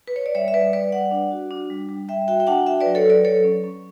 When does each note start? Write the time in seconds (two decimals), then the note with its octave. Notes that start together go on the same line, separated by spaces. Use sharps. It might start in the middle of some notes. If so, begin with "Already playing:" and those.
0.07 B4
0.16 C#5
0.26 D5
0.35 G3 C#5 E5
0.48 E5
0.54 G3 B4 D5
0.73 G3 B4 D5
0.92 G3 D5 F#5
1.11 D4
1.31 F#4
1.51 D4
1.70 G3
1.89 G3
2.08 G3 E5 G5
2.28 F#4 E5 G5
2.40 G5
2.47 D4 F#5 A5
2.66 F#4 E5 G5
2.80 B4 D5
2.86 F#3
2.95 A4 C#5
3.06 F#3 B4 D5
3.24 F#3 A4 C#5
3.44 C#4
3.64 C#4